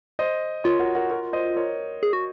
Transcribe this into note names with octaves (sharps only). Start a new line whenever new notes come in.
C5 D#5
F4 A#4 C#5
F#4 A#4
F#4 A#4
F#4 A#4
C5 D#5
A#4 C#5
G#4
F#4